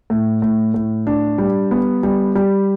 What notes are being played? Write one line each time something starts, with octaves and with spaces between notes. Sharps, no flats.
A2
A2
A2
D4
G3
B3
G3
G3